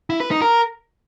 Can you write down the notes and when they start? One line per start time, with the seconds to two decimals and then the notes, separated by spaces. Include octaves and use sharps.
0.10 E4
0.20 B4
0.31 D#4
0.42 A#4